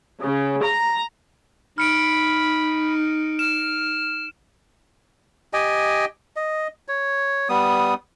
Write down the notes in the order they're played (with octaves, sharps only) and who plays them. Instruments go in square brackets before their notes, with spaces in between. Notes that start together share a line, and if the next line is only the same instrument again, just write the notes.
[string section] C#3
A#5
[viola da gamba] D#4 [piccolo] B5 [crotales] F6 C#7 D7
[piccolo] F6 [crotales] E7
[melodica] G4 D#5 G5 G#5
D#5
C#5
G3 B3 D#6